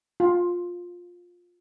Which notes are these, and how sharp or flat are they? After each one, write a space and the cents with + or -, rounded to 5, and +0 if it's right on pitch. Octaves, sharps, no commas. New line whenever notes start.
F4 +15